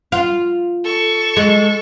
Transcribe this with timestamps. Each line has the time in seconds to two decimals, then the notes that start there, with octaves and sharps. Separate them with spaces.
0.12 F4
0.84 A4 C#6
1.37 G#3